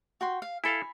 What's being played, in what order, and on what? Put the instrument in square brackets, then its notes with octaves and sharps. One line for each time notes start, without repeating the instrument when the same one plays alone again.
[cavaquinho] F#4 G5 C6
F5
[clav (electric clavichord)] E4 A4 F5 [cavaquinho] G#5 B5